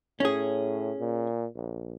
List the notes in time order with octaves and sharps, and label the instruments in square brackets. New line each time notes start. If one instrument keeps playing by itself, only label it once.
[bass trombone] A2 [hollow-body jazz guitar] C#4 G#4
[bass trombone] A#2
A#1